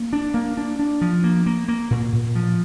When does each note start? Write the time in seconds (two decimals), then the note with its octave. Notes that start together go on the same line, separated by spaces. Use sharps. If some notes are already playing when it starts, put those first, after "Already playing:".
Already playing: A#3
0.13 D4
0.34 A#3
0.57 D4
0.79 D4
1.01 F3
1.24 A#3
1.46 A#3
1.68 A#3
1.90 A#2
2.13 A#2
2.35 F3